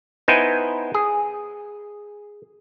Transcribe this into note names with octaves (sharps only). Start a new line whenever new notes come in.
B3 D#4 E4 C5 G5 G#5
G#4